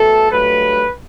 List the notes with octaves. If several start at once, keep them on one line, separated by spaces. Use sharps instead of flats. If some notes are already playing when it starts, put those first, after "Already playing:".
Already playing: B2 A3 A4
G2 F#3 A3 B4